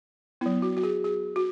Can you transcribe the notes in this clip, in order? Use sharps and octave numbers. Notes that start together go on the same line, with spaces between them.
F#3 B3 E4
F#4
F#4
G#4
G#4
F#4